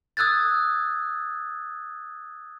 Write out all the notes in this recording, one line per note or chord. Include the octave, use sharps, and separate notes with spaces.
D#6 E6 F#6 G#6 A6